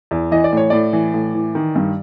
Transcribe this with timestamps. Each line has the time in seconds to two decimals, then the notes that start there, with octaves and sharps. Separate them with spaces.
0.11 E2
0.31 E3 D#5
0.44 D5
0.53 A2 C#5
0.70 A2 D5
0.93 E3
1.14 A2
1.35 E3
1.55 D#3
1.75 G2